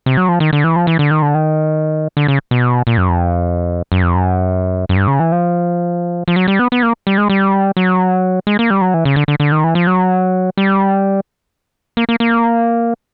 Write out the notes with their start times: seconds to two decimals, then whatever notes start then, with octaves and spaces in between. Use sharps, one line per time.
0.06 C3
0.17 F#3
0.29 F3
0.40 D#3
0.53 D3
0.64 E3
0.76 F3
0.87 E3
0.99 D3
1.11 D#3
1.22 D3
1.34 D#3
2.17 D3
2.28 C#3
2.51 B2
2.87 A#2
2.98 F#2
3.09 F2
3.92 F#2
4.03 F2
4.15 F#2
4.89 F#2
4.96 G2
5.07 C#3
5.20 E3
5.32 F3
6.28 F3
6.36 F#3
6.48 G3
6.59 B3
6.72 B3
6.83 A#3
7.07 G3
7.18 G#3
7.30 G3
7.77 F#3
8.47 G#3
8.59 A#3
8.70 G3
8.81 F#3
8.94 E3
9.05 C#3
9.16 D3
9.28 D3
9.40 D3
9.52 D#3
9.64 E3
9.75 F3
9.87 F#3
10.57 G3
11.97 A#3
12.09 A#3
12.20 A#3